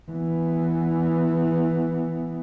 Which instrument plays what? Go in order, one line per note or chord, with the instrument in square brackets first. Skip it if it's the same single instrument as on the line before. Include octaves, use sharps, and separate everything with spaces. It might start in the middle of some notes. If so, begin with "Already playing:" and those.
[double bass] E3 B3